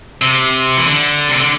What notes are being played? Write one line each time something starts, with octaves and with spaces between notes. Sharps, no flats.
C3
E3
D3
C3
D3